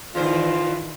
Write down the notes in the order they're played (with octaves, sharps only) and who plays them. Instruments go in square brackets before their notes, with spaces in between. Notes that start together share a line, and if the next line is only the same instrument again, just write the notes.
[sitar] E2 C5 [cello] D#3 E3 [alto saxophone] F4